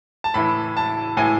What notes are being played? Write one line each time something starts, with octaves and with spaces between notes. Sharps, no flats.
A5
A2 E3 B5
A5
A2 E3 G#5